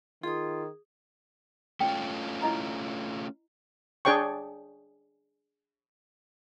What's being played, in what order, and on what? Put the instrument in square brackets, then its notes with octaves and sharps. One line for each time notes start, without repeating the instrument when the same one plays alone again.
[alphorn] D#3 [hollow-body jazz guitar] F4 [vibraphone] G#4 D#6
[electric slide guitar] A3 C#4 F4 [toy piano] G5
[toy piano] E4 D#5 A#5
[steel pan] D4 G#4 C#5 G5 C#6